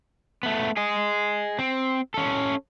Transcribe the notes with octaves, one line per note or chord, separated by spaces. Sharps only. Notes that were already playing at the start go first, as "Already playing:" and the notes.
A3 B3
G#4 D#5
C4
C#4 A4